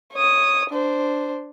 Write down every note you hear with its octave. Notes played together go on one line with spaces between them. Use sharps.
C#5 D#6
D4 C5